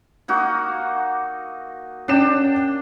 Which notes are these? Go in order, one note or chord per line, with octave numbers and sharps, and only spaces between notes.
A#3 D#4 F#4
C#4 D4 G5 E7